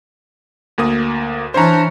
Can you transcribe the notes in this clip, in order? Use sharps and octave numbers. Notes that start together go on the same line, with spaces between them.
D2 A#3 D#6
E3 C#4 D4 C5 A#5